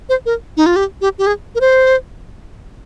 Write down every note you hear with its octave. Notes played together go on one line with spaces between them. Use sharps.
C5
A#4
D#4
F4
G4
G4
G4
G#4
A#4
C5